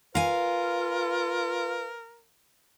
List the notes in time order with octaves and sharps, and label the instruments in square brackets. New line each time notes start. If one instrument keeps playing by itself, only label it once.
[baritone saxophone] F4 [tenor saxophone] A#4 [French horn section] B4 [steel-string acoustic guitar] F5 G#5